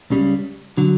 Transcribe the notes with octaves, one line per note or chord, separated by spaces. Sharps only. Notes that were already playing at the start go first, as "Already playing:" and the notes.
C#2 C#3 G3
D3 F#3